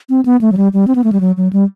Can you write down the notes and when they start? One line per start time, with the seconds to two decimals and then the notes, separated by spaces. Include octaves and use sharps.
0.09 C4
0.25 B3
0.41 A3
0.52 F#3
0.57 G3
0.73 G3
0.88 C4
0.95 B3
1.04 A3
1.12 G3
1.20 F#3
1.37 F#3
1.53 G3